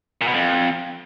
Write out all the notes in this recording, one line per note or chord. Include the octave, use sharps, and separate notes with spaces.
A#2
B2
F2